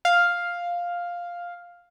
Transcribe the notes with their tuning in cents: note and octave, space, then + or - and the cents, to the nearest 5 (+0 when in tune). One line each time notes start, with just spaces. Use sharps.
F5 +5